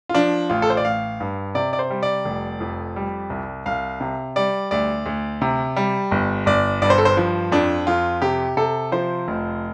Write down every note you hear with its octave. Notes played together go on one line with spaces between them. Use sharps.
F4
F3 D4
A1 F4
A4
C5
D5
A1 F5
G2
C3 D5
D5
C5
G3
D5
F1
F2
G3
C2
C2 F5
C3
G3 D5
D2 D5
D2
C3
G3
G1
G1 D5
G2 D5
C5
A4
C5
F3
F2 D4
F2 F4
C3 G4
C3 A4
F3 C5
F1